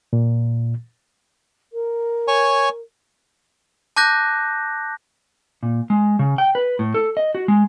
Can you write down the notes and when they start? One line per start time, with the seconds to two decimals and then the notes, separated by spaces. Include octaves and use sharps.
0.13 A#2
1.72 A#4
2.28 C#5 G#5 C#6
3.97 A5 D6 F#6 G6 A#6
5.63 A#2
5.90 G#3
6.19 C#3
6.38 G5
6.55 B4
6.79 A2
6.94 A4
7.17 D#5
7.35 F#4
7.48 G#3